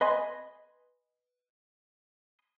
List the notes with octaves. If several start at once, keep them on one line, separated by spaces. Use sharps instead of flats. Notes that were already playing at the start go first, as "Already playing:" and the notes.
B4 D#5 G#5 C6